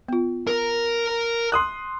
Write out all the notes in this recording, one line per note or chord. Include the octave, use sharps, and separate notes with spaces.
B3 F4
A#4 A#5
C6 D#6 F#6